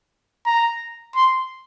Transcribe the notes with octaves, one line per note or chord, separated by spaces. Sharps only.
A#5
C6